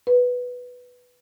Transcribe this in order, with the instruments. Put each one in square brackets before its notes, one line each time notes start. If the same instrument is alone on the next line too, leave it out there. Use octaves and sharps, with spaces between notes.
[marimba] B4